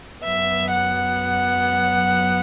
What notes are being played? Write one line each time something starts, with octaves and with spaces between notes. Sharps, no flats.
F#2 F#3 B3 E5
F#5